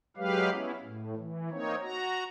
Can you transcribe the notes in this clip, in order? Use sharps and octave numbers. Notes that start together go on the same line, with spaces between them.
F#3 G#3 G4 B4 F5
B3 C#4 E4
A2
E3
A#3 C4 D#4 C#5
F#4 A#5